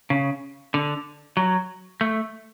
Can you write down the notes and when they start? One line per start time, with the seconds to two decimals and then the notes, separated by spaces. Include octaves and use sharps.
0.10 C#3
0.74 D3
1.37 F#3
2.01 A3